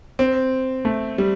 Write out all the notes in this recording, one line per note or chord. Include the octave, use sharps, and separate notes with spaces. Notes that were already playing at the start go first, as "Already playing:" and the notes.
C4
A3
G3